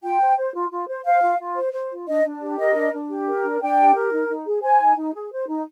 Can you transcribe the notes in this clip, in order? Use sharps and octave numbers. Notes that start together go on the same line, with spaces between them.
F4 G5
C5
C5
F4
F4
C5
C5 F5
F4
F4
C5
C5
F4
D4 D#5
D4
G4
A#4 D#5
D4
D4
G4
A#4
D4
D4 G5
G4
A#4
D#4
D#4
G#4
C5 G#5
D#4
D#4
G#4
C5
D#4